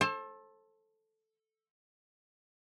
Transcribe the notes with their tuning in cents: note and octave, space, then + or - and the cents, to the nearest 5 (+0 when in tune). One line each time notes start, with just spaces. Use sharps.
A4 +0 C5 +40